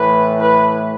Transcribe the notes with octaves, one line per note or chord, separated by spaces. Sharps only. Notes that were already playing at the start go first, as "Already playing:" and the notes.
Already playing: A2 E3 B4
B4